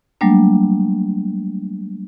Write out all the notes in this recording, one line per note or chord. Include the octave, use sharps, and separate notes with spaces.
F#3 G3 A3 A#3 D4